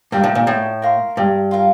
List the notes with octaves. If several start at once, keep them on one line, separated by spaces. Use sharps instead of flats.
G2 F4 A#4 D5 G5
A2
A#2
A2
A#4 F5 C6
G2
F4 A#4 F5